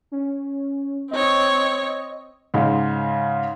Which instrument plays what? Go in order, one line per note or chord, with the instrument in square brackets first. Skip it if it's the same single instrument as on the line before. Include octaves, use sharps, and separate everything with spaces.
[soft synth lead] C#4
[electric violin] C4 C#5 [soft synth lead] D#5
[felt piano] G#2 C#3 G#3